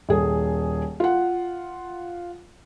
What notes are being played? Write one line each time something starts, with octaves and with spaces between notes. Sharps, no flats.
D#1 G#4
F4 F#5